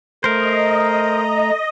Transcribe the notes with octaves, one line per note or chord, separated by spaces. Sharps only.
A3 A#4 C5 D#5 A#5